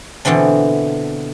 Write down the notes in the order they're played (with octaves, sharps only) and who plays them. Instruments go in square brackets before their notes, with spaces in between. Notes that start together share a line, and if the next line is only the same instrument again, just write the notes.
[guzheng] B2 D3 E3 C4 D4